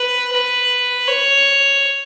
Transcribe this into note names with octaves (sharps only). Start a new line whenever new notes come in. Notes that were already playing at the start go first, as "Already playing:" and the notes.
Already playing: B4
B4
C#5